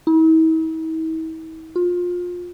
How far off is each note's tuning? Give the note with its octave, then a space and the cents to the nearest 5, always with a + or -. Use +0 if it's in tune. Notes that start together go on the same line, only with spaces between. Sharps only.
E4 -45
F4 +25